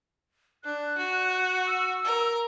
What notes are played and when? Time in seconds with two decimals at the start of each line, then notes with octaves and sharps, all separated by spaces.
0.64 D4 F#6
0.98 F#4
1.66 E6
2.04 A#4